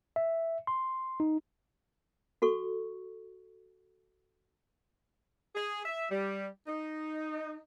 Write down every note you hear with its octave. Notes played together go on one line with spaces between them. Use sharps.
E5
C6
D#4
F#4 A4 C#6
G#4
E5
G3
D#4